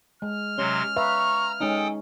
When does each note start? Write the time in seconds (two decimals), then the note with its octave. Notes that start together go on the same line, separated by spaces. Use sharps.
0.22 G#3 F6
0.58 C3 F#3 C#4 C6
0.96 B4 E5 F5 A#5 C#6
1.60 G#3 C#4 D#4 A4 G5 G#5 D#6